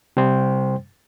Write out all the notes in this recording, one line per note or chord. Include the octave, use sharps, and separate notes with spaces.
C3 G3 C5 G5 C6